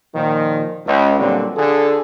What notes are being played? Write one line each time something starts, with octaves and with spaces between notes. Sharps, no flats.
A#2 D#3 F3
C#2
A#2 D3 F#3 G3 B3 C4
D3 F4 G#4 A4